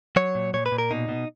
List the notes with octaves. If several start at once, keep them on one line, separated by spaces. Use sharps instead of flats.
F#3 C#5
A#2
A#2 C#5
B4
A#2
A#4
B2 D#4
B2